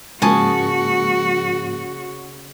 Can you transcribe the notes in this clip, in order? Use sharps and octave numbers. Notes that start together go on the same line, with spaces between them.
G#2 C#3 F3 A#3 F#4 G#5 A5 D#6